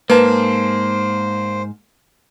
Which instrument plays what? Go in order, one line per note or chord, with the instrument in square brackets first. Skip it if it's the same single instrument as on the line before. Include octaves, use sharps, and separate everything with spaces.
[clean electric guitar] G#2 A5 [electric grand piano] A#3 [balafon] B4 [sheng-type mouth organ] C5